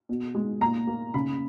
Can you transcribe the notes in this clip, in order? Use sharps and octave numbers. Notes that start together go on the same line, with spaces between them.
B2
G#3
A#2 A#5
A#3
C#3 B5